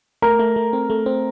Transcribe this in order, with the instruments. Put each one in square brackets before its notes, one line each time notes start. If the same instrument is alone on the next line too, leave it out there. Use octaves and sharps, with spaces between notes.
[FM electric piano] A3 [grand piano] A#4 A#5
[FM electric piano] A3
A3
C4
A3
C4